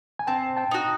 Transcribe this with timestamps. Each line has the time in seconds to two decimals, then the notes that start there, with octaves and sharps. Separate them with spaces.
0.19 G#5
0.27 C4 G5 A5
0.57 G5 A5
0.71 D#4 F#4